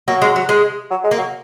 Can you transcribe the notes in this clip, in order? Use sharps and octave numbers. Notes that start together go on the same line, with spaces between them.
F#3 A#3
G#3
F#3
G#3
F#3
G#3
A#3
F#3